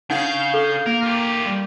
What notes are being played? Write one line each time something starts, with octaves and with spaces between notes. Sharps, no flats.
C#3 D4 D#4 G#4 F5 F#5 G6
A4
A#3 A#4
F4 G4
G3